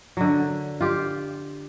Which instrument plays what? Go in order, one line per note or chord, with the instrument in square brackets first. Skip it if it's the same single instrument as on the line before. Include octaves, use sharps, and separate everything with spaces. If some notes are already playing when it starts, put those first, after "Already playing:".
[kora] D3 F#3
F4 G4